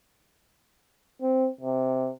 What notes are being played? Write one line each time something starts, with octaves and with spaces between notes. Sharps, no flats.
C4
C3